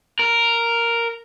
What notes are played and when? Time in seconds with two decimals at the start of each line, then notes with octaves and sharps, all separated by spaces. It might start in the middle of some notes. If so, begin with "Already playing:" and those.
0.19 A#4